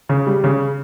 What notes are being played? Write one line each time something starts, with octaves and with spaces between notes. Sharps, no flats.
C#3
G3
C#3